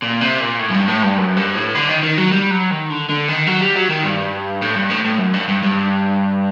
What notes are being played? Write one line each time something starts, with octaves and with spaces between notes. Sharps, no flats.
A#2
C3
A#2
A2
F#2
G2
A2
G2
F#2
G2
A2
D3
D#3
D#3
F#3
G3
F#3
D#3
D3
D3
D#3
F#3
G3
F#3
D#3
G2
A2
G2
A2
A2
F#2
G2
G2
G2